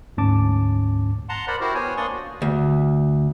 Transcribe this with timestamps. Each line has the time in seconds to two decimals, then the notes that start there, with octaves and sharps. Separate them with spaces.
0.17 D2 G#2 C#4 A5 D6
1.29 F#5 A5 A#5 C6
1.48 A#4 C5 D5 F#5 B5
1.61 E4 F#4 G4 A#4 C5
1.75 B3 C5 C#5 G#5
1.97 A#3 D4 D5 C6 C#6 D#6
2.12 F#4
2.42 D2